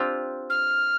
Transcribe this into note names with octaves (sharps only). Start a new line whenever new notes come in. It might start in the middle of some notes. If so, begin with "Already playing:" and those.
Already playing: C4 D4 F4 G4
F6